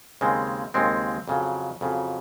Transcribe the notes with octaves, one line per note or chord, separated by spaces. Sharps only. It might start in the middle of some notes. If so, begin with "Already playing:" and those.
D#2 C#3 G#3 C4
D#2 C#3 G#3 C4
F2 C#3 F#3
F2 C#3 F#3